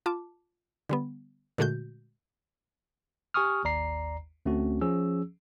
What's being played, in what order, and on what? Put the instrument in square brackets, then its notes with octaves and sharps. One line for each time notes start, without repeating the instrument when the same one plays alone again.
[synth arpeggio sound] F4 A5 D6
D3 G3 B3
A#2 D3 G#3 A3 F#4 G6
[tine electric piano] G4 G#5 C#6 D#6 F6
G#1 D#2 D5 A#5 C7
D2 A3 C4 C#4 F#4
F3 C#4 G#4 E6